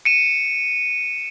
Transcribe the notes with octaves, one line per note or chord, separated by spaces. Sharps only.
C#7 D#7 E7